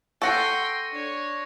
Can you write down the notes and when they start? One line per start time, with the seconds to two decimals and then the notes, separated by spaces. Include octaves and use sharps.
0.22 A4 F#5 G5 C6 C#6 A#6 C#7
0.91 D4 C#5